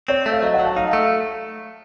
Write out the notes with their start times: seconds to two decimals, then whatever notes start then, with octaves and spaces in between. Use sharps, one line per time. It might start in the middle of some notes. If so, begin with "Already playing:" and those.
0.08 C4 C#5
0.26 A3
0.32 F5
0.42 F#3 D#5
0.54 F#3 F#5
0.65 A5
0.76 D#4 F5
0.93 A3